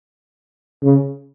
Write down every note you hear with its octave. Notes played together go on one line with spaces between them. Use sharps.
C#3